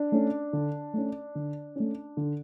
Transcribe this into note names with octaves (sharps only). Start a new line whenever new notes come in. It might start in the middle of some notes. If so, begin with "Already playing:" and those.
Already playing: D4
A3 C#4
D3
A3 C#4
D3
A3 C#4
D3